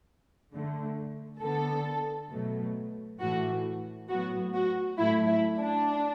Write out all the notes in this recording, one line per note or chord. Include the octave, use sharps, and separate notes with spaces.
D3 A3
D3 B3 A4
B2 F#3 A3
A2 E3 A3 F#4
A2 F#3 B3 F#4
F#4
A2 F#3 A3 E4
E4
D4